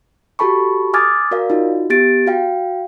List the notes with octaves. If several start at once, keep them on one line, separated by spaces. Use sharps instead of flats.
F#4 G4 A4 A5 B5 C#6
G#5 D6 D#6 F6 G#6 A6
F#4 A#4 D5 F5
D#4 F4 F#4
B3 G4 A6 D7
F#4 F5 G5